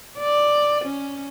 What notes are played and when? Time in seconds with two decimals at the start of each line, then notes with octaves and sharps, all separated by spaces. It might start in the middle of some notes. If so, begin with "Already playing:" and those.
0.18 D5
0.85 C#4